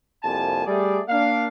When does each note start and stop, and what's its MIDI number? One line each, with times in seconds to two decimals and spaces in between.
0.24 0.66 36
0.24 0.66 41
0.24 0.66 48
0.24 0.66 58
0.24 0.66 80
0.24 0.66 81
0.66 1.00 55
0.66 1.00 57
0.66 1.00 68
0.66 1.00 74
1.09 1.48 58
1.09 1.48 62
1.09 1.48 77